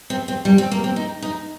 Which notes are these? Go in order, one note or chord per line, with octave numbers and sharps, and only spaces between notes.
C4
C4
G3
C4
A#3
C4
D#4
D#4